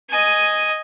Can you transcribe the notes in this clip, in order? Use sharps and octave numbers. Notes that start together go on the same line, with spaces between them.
D#5 G#5